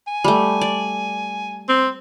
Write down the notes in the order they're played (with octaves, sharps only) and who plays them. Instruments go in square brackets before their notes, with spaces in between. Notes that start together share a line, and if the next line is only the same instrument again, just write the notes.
[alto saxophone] G#5
[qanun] G3 A3
D5
[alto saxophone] C4